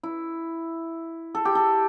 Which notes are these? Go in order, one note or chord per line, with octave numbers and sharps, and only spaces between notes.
E4
A4
G4
A4